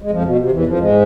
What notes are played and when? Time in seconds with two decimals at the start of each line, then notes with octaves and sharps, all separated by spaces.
0.02 G#3
0.11 F2 F3
0.25 B2
0.39 C3
0.52 E2 E3
0.66 F2 F3
0.79 G#2 G#3